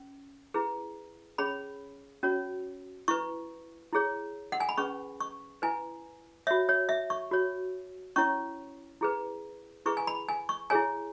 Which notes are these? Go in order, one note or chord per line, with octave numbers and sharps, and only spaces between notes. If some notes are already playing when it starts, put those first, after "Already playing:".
Already playing: C#4
E4 G#4 B4
C#4 G#4 C#5 B5
C#4 F#4 C#5
E4 B4 C#6
E4 G#4 C#5
F#5
G#5
B5
C#4 G#4 B4 C#6
C#6
E4 B4 G#5
F#4 C#5 E5
C#5
E5
C#6
F#4 C#5
C#4 E4 C#5 C#6
E4 G#4 B4
E4 G#4 B4 C#6
G#5
B5
G#5
C#6
E4 G#4 C#5 G#5